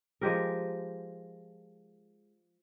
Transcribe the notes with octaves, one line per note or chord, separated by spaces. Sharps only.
F3 G#3 G4 A#4